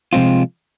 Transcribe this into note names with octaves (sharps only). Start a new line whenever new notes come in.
C3 F3 G#3 C4 F4